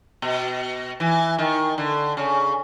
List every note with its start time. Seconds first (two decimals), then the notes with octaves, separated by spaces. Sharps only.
0.22 B2
1.00 E3
1.38 D#3
1.78 D3
2.17 C#3